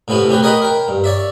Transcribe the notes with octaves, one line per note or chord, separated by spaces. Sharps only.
A2 C3 B3 C#4 E4
C3 C#4 G4 G#4 B4
A#4 C#5 D#5 F#5 G5 B5
A#4 G5
G2
C#5 D5 E5